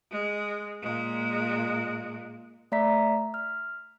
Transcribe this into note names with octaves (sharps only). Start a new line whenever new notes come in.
G#3
A#2 G#3
A3 D5 E5 A#5 B6
F6